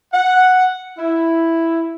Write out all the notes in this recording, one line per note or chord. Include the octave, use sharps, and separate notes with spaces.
F#5
E4